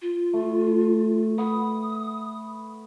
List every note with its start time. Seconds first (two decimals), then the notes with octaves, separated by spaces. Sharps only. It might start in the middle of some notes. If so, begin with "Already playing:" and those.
0.02 F4
0.33 A3
1.38 B4 F#5 D#6